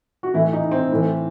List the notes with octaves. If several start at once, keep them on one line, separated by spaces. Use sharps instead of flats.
F#4
A2 E3 E4
D#4
C4
A2 E3